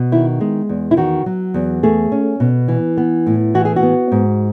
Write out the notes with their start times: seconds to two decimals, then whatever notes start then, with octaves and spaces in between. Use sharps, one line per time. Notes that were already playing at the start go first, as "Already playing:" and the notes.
Already playing: B2
0.12 D#3 E4
0.41 G#3
0.69 E2
0.91 E4
0.97 D#3 F#4
1.26 F#3
1.54 E2
1.83 A3 G#4
2.12 C#4
2.40 B2
2.68 E3
2.97 B3
3.27 A2
3.54 E3 F#4
3.65 G#4
3.76 F#4
3.83 B3
4.12 G#2